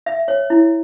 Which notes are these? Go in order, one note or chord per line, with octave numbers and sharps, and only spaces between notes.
E5
C#5
E4